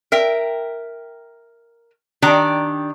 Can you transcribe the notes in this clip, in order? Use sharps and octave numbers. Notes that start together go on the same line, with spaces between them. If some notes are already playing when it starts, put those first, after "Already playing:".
A#4 E5 G5
D#3 D4 G4 D5 A#5